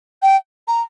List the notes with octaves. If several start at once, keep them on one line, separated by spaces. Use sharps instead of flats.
G5
A#5